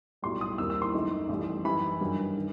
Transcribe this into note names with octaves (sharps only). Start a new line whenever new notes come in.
B1 A2 G3 C6
D#6
D#2 D#3 G3 C4 D#4 E6
E6
C6
F#2 D#3 A3 D#4
A1 A2 G3
F#2 E3 G3 D#4 B5
G2 D#3 F#3
D#3